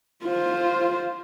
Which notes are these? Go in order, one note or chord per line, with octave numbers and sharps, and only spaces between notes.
F4 C5